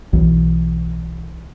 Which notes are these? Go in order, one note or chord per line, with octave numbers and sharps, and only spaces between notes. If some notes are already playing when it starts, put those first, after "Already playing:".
B1 E3